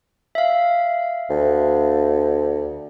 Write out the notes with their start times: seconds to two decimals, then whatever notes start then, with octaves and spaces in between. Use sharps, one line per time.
0.35 E5 F5
1.30 D2